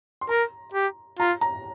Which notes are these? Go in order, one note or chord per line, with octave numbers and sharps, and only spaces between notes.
C6
A#4 A#5
G4
F4 A#5
A#5